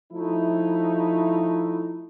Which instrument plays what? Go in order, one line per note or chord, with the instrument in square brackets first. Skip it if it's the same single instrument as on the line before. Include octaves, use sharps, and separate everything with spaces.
[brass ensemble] F3 A3 D#4 E4